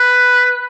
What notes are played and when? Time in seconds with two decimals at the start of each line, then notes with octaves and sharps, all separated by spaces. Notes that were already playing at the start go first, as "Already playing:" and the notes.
Already playing: B4